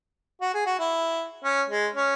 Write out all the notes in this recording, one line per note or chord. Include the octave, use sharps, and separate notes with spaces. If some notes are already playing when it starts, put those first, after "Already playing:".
F#4
G#4
F#4
E4
C#4
G#3
C#4